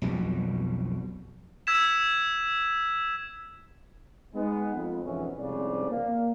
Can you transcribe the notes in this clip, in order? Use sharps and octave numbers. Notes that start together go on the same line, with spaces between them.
B1 F2 B2 G3
E6 G#6 B6 E7
G#3 B3 D#4
F2
F2 G#2 B2 E3 B3 C#4
C2 F2 G#2 C#3 D5
A#3